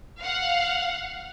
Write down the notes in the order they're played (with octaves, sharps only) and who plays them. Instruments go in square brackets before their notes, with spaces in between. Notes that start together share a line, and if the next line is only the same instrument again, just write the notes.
[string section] F5 F#5